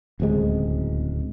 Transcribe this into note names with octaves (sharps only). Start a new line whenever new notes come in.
D1 C#2 C3 G#3